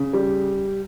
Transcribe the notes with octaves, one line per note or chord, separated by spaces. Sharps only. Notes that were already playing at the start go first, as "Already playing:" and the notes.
Already playing: C#3
G3